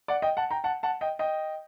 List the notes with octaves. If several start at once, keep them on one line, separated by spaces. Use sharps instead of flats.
D5 F#5
D#5 G5
F#5 A5
G5 A#5
F#5 A5
F#5 A5
D#5 G5
D#5 G5